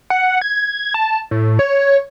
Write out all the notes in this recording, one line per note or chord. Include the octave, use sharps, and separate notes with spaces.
F#5
G#6
A5
A2
C#5